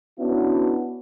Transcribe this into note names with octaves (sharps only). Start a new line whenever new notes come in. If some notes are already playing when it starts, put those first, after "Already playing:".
B3 C#4 D4 E4 F#4